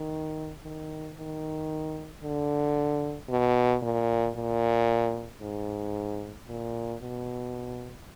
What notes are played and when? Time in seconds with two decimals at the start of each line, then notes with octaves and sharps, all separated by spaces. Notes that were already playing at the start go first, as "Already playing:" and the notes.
Already playing: D#3
0.64 D#3
1.17 D#3
2.23 D3
3.29 B2
3.82 A#2
4.35 A#2
5.41 G#2
6.48 A#2
7.01 B2